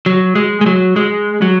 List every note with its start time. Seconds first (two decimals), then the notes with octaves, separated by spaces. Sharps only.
0.06 F#3
0.35 G#3
0.61 G#3
0.66 F#3
0.96 G#3
1.42 F#3